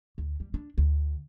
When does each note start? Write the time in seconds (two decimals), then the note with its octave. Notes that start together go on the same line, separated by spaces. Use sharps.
0.18 D2
0.40 G3
0.54 D4
0.78 D2